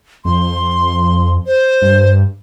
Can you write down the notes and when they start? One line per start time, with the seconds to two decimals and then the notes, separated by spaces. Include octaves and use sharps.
0.25 F2 C6
1.46 C5
1.82 G2